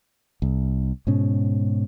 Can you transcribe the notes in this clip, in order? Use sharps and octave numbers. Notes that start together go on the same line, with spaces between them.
C2
G#2 B2 C#4